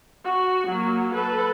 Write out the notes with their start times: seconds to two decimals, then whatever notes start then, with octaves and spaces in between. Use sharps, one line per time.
0.24 F#4
0.68 F#3 A#3
1.14 A4 B4